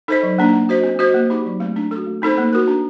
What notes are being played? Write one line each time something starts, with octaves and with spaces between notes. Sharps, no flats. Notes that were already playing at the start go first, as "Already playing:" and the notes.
D#4 A4 C5 D#5
F#3
A#3 D4
A#3
F#4 C5 D#5
C4
F#4 C5 D#5
A#3
D#4 G4
F#3
A3 C4
D4
F#4 A4
A3
C4 D#4 A4 C5
A#3
F#4 A#4
D4